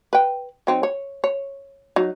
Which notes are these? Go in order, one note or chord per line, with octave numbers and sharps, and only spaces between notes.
B4 G5
F#3 C4 D#4
C#5
C#5
F#3 D#4